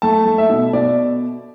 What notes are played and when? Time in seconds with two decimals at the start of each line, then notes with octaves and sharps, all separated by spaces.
0.02 A3 A5
0.26 A3
0.38 E5
0.50 B2
0.73 B2 D5